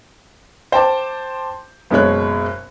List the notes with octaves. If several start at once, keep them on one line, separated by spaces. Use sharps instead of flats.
C5 G5 A5 D6
F#1 B2 G#3 C#5 F#6